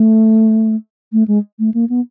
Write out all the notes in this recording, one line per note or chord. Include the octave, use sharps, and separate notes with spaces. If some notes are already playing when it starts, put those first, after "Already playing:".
Already playing: A3
A3
G#3
A3
A#3
B3